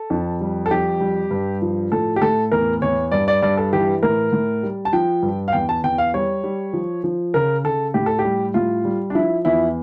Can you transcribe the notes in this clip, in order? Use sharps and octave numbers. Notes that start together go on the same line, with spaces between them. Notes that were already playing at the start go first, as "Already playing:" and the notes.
Already playing: A4
F2
G3
A4
F2 G4
G3
G2
F3
A2 A4
G4
A2 A4
E2 A#4
E2 C#5
G2 D5
D5
G2 D5
A4
E3 G4
A2 A#4
A2
G3
A5
F3 G5
G2
F5
E2 G5
A5
E2 G5
F5
G3 C#5
G3
F3
F3
C#3 A#4
C#3 A4
A2 G4
A4
G4
G3
A2 F4
G3
D4
F3 E4
E2 E4